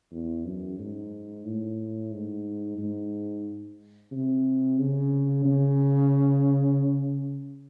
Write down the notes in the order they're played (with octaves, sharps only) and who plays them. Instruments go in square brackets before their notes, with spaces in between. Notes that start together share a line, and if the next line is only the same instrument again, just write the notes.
[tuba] E2
F#2
G#2
A2
G#2
G#2
C3
C#3
C#3